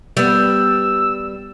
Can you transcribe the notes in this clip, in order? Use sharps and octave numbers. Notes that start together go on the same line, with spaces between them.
G3 B3 E6